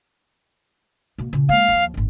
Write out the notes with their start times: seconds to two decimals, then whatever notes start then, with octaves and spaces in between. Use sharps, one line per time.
1.18 B2 A#3
1.33 A#2 C#3
1.49 G#3 A#3 F5
1.69 D#2 F3
1.94 G1 A2